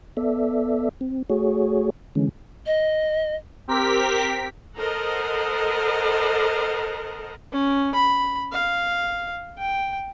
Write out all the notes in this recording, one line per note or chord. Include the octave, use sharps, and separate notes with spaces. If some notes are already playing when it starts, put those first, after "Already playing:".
B3 A4 D5 E5
C4
A3 F#4 G#4 C#5
D3 E3 G#3 C#4
D#5
C4 G4 A#4 B6
A4 A#4 C5 D#5 F#5
C#4
B5
F5
G5